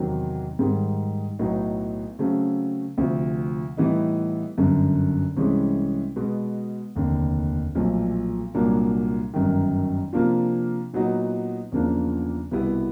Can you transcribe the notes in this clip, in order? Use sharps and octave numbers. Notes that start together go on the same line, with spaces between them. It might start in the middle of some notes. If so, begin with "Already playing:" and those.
Already playing: E2 C3 D#3 F#3
G#2 D#3 G3
B1 A2 F#3 B3 D#4
C#3 F#3 A3 C4
D2 C3 F3
A2 E3 G3 B3 D#4
G1 F#2 D3
C2 C3 E3 G#3 C#4
B2 G#3 B3
F1 D#2 D3
B1 A#2 F3 A3
C2 A#2 F#3 A#3 D4
G1 F#2 D#3
C3 F3 A#3 D4 F4
A#2 F#3 B3 D#4 F#4
E2 C#3 F3 A#3 D4
C2 B2 G3 B3 E4